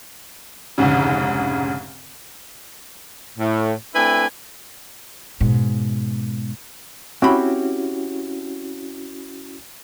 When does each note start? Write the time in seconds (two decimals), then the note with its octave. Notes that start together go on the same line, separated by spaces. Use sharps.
0.78 F1 D2 G#2 C#3
3.38 A2
3.94 A3 C4 D4 E4 B4 G#5
5.40 G#2 B2
7.22 C4 C#4 E4 F#4 G4 B5